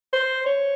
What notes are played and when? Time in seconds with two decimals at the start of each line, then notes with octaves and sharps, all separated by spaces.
0.13 C5
0.46 C#5